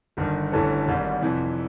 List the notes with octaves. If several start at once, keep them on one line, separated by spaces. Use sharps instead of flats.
G1 G2 D#3 G3
G1 G2 E3 A3 C#4
G#1 G#2 D#3 G3
F2 C3 E3